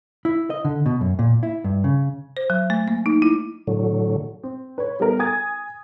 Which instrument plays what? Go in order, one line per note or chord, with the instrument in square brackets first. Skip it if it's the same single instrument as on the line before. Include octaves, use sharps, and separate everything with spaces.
[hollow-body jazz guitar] E4
D#5
D3
B2
F#2
A#2
E4
G2
C#3
[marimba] C5
F#3
A3
A#3
D#4
E4
[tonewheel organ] A2 D3 F#3
[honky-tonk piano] C4
B4 C#5
G3 B3 A#4
G#5 D#6 G#6 A6